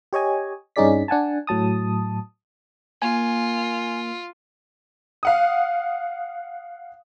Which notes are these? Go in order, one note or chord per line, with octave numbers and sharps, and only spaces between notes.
G4 C#5 D#5 G#5
G2 C#4 D#4 G#4 D5 B6
D4 F#5 G#5 A5
A2 F#3 A5 D#6
A#3 F4 G#5
F5 F#5 D#6